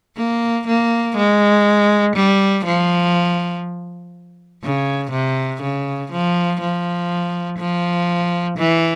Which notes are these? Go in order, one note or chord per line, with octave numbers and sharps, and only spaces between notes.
A#3
A#3
G#3
G3
F3
C#3
C3
C#3
F3
F3
F3
E3